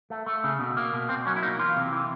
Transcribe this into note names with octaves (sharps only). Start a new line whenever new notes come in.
A3
A3
C#3
B2
A#3
B2
B2 C4
F#3 C#4
E4
A#3 D#4
E3 F4
C3
E3